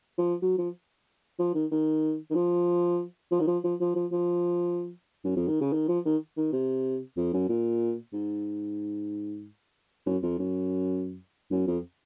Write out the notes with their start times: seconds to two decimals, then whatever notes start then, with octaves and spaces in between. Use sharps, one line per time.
0.18 F3
0.42 F#3
0.58 F3
1.39 F3
1.55 D#3
1.71 D#3
2.31 D#3
2.35 F3
3.31 F3
3.40 D#3
3.47 F3
3.64 F3
3.80 F3
3.95 F3
4.12 F3
5.24 F#2
5.36 F2
5.48 D#3
5.61 C#3
5.73 D#3
5.88 F3
6.05 D#3
6.37 D#3
6.53 C3
7.17 F2
7.33 F#2
7.49 A#2
8.13 G#2
10.06 F#2
10.23 F2
10.39 F#2
11.51 F#2
11.67 F2